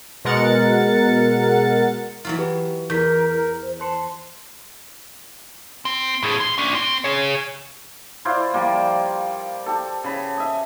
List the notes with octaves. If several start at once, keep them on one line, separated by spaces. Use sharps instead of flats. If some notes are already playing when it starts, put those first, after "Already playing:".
B2 G#3 A#4 F#5 A6 C#7
E3 F#3 F4
G4 B4 F#5
E2 A#4 G6 B6
A#4
C5
C5 A5 C6 C#7
C4
A2 G#4
C#2 C6
C#4 D4
C4
G#4 C#5
E4 F4 C5 D5
F3 G3 A#3
G4 A4
C#3 B5
D#5 E5